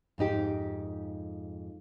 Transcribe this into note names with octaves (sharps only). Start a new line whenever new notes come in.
F2 G#2 D#4 G4